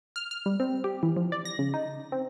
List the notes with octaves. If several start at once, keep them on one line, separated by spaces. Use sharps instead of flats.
F6
F6
G3
C4
G4
E3
F3
D5
A#6
C#3
D#4
C4